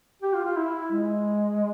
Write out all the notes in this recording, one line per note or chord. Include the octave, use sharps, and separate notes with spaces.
G4
F4
F4
E4
G#3